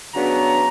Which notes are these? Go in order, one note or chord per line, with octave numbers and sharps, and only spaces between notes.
C#3 F#3 B3 D4 F#4 A#5